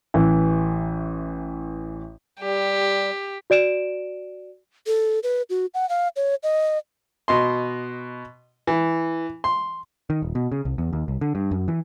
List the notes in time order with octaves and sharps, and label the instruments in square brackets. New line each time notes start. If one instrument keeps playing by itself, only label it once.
[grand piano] A1 E3
[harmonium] G3 [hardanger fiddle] G4
[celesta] F#4 D5 D7 E7
[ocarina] A4
B4
F#4
F#5
F5
C#5
D#5
[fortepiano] B2 D#5 C6
E3
C6
[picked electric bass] D#3
D#1
B2
C#3
C2
E2
D#2
C2
D3
G2
F#2
E3